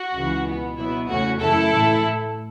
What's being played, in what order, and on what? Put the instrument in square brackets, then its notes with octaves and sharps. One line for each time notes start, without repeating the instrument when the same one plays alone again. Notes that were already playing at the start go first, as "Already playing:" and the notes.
Already playing: [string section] F#4
C#2 C#3 E3
B2 B3
B2 F#3 B3 E4
E2 C#3 A3 C#4 F#4
F#2 C#3 E3 A3 E4 A4
A2 E3 A3